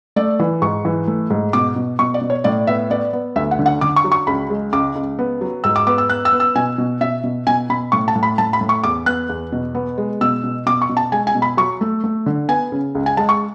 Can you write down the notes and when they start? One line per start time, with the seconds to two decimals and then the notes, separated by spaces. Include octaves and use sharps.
0.16 A3 D5
0.40 E3
0.62 G#2 C#6
0.85 E3
1.08 A3
1.30 G#2
1.53 B2 D6
1.76 B2
1.99 B2 C#6
2.14 D5
2.21 B2
2.30 C#5
2.44 A2 D5
2.67 B3 E5
2.90 B3 D5
3.13 B3
3.36 D2 E5
3.51 F#5
3.59 D3
3.66 F#5
3.81 D3 D6
3.96 C#6
4.04 F#3
4.12 C#6
4.27 C#2 B5
4.50 G#3
4.73 C#2 D6
4.95 C#2
5.19 B3
5.41 F#3
5.64 G#2 E6
5.76 D6
5.87 B3 D6
5.98 E6
6.10 B3 F#6
6.25 E6
6.32 B3
6.40 E6
6.55 B2 G#5
6.78 B2
7.01 B2 E5
7.24 B2
7.47 B2 G#5
7.69 B2 B5
7.92 A2 C#6
8.08 A5
8.15 A2
8.23 B5
8.38 A2 A5
8.53 B5
8.61 A2
8.69 C#6
8.84 E2 D6
9.06 B3 F#6
9.29 E2
9.52 B2
9.75 B3
9.98 G#3
10.21 B2 E6
10.44 B2
10.66 B2 D6
10.82 C#6
10.89 B2
10.97 A5
11.12 G#3 G#5
11.27 G#5
11.35 B2
11.42 B5
11.57 F#3 C#6
11.81 A3
12.04 A3
12.26 D3
12.49 B3 G#5
12.72 C#3
12.95 C#2
13.06 G#5
13.17 G#3 A5
13.29 C#6